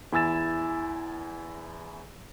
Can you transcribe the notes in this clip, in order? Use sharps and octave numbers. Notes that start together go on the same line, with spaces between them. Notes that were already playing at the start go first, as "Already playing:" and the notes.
E2 E4 G#5 E6 A6 E7